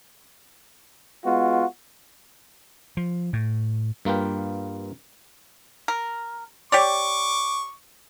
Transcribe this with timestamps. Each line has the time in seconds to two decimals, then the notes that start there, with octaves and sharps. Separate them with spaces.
1.26 G#3 B3 F4 F#4
2.97 F3
3.33 A2
4.05 G2 A#3 F4 B4 G5
5.88 A#4
6.72 G4 C#5 D5 C#6 D6